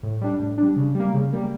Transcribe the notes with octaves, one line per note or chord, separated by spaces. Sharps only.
A2
G3 D4
A2
G3 D4
C#3
G3
A#3
C#3
G3 A#3